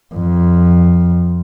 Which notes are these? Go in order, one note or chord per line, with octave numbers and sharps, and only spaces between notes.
F2